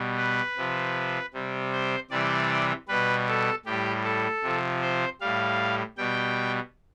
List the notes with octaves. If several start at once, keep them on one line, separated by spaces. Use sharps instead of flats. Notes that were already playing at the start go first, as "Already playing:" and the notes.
Already playing: B2 G3
B4
C3 F3
C3 G3
C5
C3 E3 G3 D5
B2 G3 B4
A4
A2 G3 G4
A4
C3 F3
C5
A2 G3 F5
B2 G3 G5